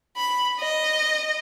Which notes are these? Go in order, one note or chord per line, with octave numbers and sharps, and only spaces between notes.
B5
D#5